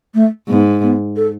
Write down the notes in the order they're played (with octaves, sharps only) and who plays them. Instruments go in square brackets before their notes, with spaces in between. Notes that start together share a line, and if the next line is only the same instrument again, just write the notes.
[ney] A3
[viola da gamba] G#2 [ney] B3
[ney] B3
A4